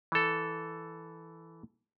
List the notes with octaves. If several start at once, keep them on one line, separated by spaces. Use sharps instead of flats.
E3 A4